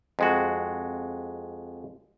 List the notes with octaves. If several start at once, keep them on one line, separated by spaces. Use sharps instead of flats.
F2 G#3 F#4